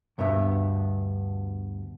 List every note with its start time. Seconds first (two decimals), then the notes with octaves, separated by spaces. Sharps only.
0.18 D2 G2 B2 B3 E5